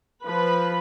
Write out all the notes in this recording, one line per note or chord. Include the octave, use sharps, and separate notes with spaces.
F3 B4 B5